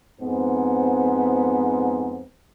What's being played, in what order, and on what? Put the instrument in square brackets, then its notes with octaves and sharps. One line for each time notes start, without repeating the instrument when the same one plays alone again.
[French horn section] F2 G#2 B3 C4